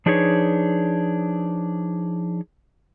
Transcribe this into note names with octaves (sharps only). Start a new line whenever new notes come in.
F3 D4 D#4 G#4 B4 C#5